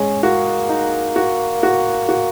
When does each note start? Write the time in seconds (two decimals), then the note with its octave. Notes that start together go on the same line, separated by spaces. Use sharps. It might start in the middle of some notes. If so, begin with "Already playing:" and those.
Already playing: G#3 C#4
0.23 A#3 F#4
0.69 D#4
1.16 F#4
1.63 F#4
2.09 F#4